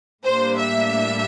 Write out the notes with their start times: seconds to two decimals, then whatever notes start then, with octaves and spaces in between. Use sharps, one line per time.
0.25 A2 G3 A#3 D4 C5
0.60 E5